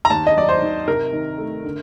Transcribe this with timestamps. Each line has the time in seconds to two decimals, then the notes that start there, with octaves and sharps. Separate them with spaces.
0.05 A#5
0.10 D#2 A5
0.27 D#5
0.36 F#3 D5
0.49 C5
0.62 D#3
0.88 C3 A#4
1.13 D#3
1.38 A3
1.65 D3